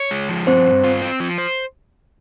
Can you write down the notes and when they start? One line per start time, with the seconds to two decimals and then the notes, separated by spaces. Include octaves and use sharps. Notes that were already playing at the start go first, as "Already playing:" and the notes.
Already playing: C#5
0.11 G#3
0.29 F3
0.47 G2 C4 C5
0.66 G2
0.84 F4
1.02 C4
1.20 F3
1.38 C5